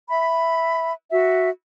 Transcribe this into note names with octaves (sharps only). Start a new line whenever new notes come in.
E5 B5
F#4 E5